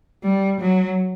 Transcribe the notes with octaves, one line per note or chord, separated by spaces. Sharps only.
G3
F#3